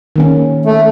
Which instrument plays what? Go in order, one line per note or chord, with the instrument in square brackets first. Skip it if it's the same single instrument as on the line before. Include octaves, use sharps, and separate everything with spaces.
[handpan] D#3 A#3 C#4
[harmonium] A3